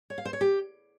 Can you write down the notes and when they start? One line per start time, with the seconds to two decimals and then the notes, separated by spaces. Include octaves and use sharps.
0.10 C#5
0.18 F5
0.25 C5
0.33 C#5
0.41 G4